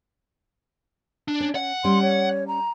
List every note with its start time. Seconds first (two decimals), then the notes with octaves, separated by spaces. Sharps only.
1.28 D4
1.40 C#4
1.55 F#5
1.84 G3 C#4 C6
2.02 C#5
2.48 A#5